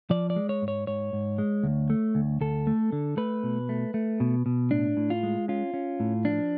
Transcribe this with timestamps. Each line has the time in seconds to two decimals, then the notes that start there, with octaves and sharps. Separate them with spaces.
0.10 F3 D5
0.30 D5
0.36 G#3
0.49 C#5
0.62 G#2
0.68 C#5
0.87 G#2 C#5
1.13 G#2
1.38 G#3
1.63 D2
1.90 A3
2.15 D2
2.41 D2 A4
2.67 A3
2.92 D3
3.17 A3 B4
3.43 B2
3.69 A3
3.94 A3
4.20 B2
4.46 B2
4.71 A2 D4
4.97 A2
5.10 F4
5.23 G#3
5.48 C#4 F4
5.74 C#4
6.00 A2
6.25 F3 D4